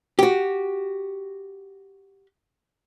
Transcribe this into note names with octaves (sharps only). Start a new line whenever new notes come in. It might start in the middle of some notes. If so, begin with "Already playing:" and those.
F#4 G4